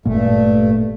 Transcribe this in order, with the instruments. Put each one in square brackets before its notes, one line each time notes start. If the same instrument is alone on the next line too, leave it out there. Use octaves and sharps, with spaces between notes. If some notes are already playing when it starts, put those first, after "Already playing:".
[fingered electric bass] G#1 A#2 A#3 [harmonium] G2 A3